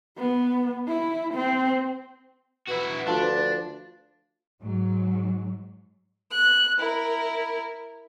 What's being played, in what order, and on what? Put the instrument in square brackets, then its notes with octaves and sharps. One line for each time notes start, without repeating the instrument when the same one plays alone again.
[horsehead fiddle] B3
E4
C4
[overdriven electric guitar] E4 F#4 [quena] B4
[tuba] D2 [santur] F3 [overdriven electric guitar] D4
[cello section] G#2 F#3
[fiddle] F#6
E4 A#4